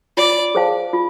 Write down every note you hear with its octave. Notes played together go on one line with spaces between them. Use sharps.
F4 D5
G#4 C5 F5 A5
F4